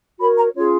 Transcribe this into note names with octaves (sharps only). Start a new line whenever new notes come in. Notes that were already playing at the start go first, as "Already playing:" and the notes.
F#4 A#4 C#5 B5
A#5
C#4 F4 G#4 C#5